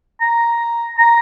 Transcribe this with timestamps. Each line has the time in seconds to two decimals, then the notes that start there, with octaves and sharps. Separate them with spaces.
0.21 A#5
0.98 A#5